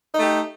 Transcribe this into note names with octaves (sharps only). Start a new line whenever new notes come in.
A3 D#4 G4